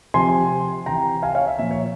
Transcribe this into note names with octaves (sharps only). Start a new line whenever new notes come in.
C3 F3 G#5 C6
C3 E3 G5 A#5
F5 G#5
C#5 F5
E5
A#2 F3 E5
C#5